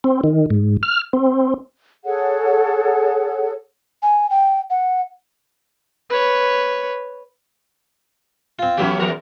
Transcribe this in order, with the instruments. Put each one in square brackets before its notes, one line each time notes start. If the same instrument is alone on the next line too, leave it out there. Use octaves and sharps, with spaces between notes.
[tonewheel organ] C4
D#3
G#2
F6
C4
[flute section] G#4 A4 C#5 F#5
[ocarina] G#5
G5
F#5
[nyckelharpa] B4 C#5
[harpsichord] C4 F4
[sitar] E3 A3 C#4 [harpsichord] F#3 B3 G4
[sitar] E2 F3 A#4